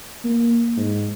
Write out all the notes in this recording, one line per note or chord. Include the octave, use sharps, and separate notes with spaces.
A#3
G#2